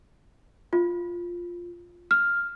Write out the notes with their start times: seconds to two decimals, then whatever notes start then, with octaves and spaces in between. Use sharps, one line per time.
0.73 F4
2.11 F6